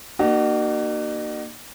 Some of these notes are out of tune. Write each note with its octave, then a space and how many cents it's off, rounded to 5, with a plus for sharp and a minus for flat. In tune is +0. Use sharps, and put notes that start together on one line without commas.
A#3 +0 D#4 -45 F#4 +30